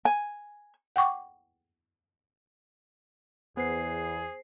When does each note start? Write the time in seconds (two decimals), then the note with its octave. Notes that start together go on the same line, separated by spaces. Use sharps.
0.05 G#5
0.96 F#5 G5 C#6 D6
3.57 E2 B3 G#4 C5 C7